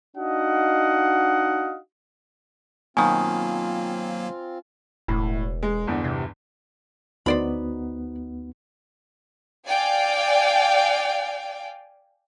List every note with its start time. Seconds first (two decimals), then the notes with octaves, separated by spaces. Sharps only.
0.17 D4 D#4 F#4 D#5 F5 F#5
2.97 B2 D#3 F#3 A#3 C4 F4 G#5
5.08 E1 A2
5.63 G#3
5.87 G1 E2
6.04 C3
7.26 D2 B3 D#4 F#4 C5 D5 B5
9.68 D5 F5 G5 G#5